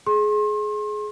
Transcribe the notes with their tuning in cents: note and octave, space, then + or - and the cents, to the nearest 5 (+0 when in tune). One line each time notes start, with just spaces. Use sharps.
G#4 +20 C6 +40